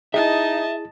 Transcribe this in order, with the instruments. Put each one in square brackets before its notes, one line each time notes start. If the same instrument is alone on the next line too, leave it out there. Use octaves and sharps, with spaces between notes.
[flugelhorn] D#4 [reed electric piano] E4 G#4 [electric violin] D#5 A5 [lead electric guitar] E5